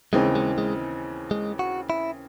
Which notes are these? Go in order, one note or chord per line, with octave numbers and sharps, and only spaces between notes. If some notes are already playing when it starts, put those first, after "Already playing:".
D#2 C#3 E3 G#3 C4 D#4
G#3
G#3
G#3
F#4
E4